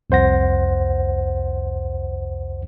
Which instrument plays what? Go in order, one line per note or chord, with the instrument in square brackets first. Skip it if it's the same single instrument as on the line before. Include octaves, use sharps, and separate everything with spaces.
[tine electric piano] C2 F2 C5 F#5 A#6